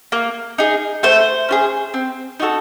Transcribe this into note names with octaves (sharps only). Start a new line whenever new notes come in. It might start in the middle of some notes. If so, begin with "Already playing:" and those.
A#3
D#4 G#4
A3 C5
C#4 F4 G#4
C4
D#4 F#4 A4